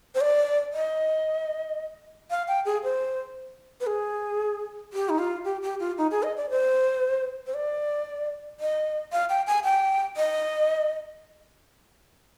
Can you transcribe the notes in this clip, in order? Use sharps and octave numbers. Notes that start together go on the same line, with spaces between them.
C5
D5
D#5
F5
G5
G#4
C5
B4
G#4
G4
D#4
F4
G4
G4
F4
D#4
G#4
D#5
D5
C5
C5
D5
D#5
F5
G5
G#5
G5
D#5